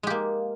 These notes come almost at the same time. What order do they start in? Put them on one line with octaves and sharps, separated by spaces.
G#3 G4 A#3